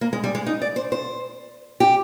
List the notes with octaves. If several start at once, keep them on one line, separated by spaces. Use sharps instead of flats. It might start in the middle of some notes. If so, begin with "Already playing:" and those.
A#3
G#3
G3
G#3
D#4
D5
C5
C5
G4